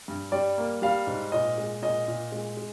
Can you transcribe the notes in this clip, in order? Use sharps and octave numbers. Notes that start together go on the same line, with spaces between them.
G2
G3 D5
A#3
G3 F5
G#2
A#2 D#5
G#3
A#2 D#5
A#2
G#3
G#3